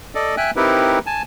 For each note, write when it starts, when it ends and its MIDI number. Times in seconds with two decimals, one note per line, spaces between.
0.15 0.36 69
0.15 0.36 74
0.15 0.36 75
0.37 0.51 76
0.37 0.51 79
0.37 0.51 80
0.37 0.51 90
0.56 0.99 60
0.56 0.99 63
0.56 0.99 64
0.56 0.99 67
0.56 0.99 70
0.56 0.99 71
1.06 1.22 80
1.06 1.22 81